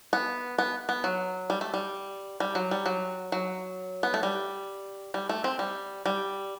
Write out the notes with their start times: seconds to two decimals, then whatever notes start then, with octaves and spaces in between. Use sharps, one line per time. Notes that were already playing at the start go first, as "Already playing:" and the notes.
0.13 B3
0.58 B3
0.89 B3
1.04 F#3
1.50 G3
1.61 A3
1.74 G3
2.40 G3
2.55 F#3
2.71 G3
2.86 F#3
3.32 F#3
4.03 B3
4.14 A3
4.23 G3
5.14 G3
5.29 A3
5.44 C4
5.59 G3
6.06 G3